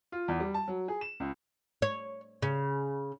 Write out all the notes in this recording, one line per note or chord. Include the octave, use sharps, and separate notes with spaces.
F4
E2
G3
A5
F#3
G#4
E7
C#2
C#5
C#3